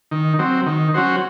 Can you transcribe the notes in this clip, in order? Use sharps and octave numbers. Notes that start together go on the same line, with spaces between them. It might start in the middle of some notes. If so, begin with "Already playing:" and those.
D#3
F#3 C4
D#3
F#3 C#4 F#4 C5